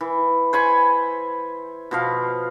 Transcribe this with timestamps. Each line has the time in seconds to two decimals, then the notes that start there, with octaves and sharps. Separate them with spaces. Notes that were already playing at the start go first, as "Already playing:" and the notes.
0.01 E3
0.53 C5 G#5 B5 C#6
1.91 B2 F3 F5